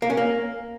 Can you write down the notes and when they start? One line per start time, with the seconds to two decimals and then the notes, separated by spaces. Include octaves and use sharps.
0.02 A#3
0.10 C#4
0.17 A#3